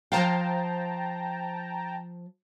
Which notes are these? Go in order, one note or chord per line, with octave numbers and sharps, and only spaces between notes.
F3 C5 F5 G5 A5 A#5